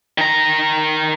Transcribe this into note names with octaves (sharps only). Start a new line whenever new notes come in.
D#3 A#5